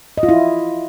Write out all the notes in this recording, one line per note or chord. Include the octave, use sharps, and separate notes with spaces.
D#5
F4
E4